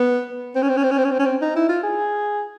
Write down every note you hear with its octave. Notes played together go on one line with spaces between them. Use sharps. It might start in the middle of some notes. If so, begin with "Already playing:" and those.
Already playing: B3
C4
C#4
C4
C#4
C4
C#4
C4
C#4
C4
C#4
C4
D#4
E4
F4
G#4